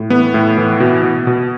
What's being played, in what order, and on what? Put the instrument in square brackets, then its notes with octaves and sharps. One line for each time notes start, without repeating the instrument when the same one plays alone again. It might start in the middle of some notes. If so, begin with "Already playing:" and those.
Already playing: [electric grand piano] A2
E3 B3
A2
E3
B2
B2
B2